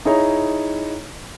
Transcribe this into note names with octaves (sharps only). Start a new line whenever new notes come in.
D#4 E4 G#4 C#5 A#5